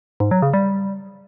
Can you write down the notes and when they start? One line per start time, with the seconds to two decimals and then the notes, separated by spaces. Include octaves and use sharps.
0.20 G#2
0.31 F#3
0.42 C#3
0.54 G3